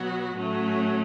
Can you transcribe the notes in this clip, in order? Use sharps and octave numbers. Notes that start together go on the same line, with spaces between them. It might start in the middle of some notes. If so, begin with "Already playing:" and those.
Already playing: B2 F#3 B3 F#4
A2 F#3 A3 C#4